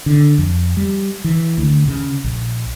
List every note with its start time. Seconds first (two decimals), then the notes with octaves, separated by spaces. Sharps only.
0.06 D3
0.38 F2
0.77 G3
1.24 E3
1.58 D2
1.88 C#3
2.24 A#1